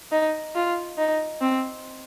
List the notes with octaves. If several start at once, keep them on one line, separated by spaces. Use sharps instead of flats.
D#4
F4
D#4
C4